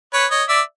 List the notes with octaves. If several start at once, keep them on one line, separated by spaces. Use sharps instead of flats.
B4 C#5
C#5 D#5
D5 E5